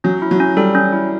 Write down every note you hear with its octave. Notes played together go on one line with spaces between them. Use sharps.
F#3 C#4
E4
F#3
C#4
G3 A4
C#4
E4